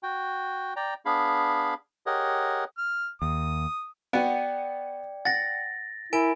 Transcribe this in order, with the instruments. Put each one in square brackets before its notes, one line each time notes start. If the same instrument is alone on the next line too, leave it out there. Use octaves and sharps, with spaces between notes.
[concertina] F#4 G5
D5 G5 A#5
B3 D4 G#4 F5 B5
G4 G#4 A#4 C#5 D#5 F#5
[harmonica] F6
[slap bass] D#2 [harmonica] D#6
[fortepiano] B3 F#4 [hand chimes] D5 G5
[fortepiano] F#5 [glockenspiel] A6 A#6
[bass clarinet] E4 [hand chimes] A#4 [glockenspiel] G#5 D7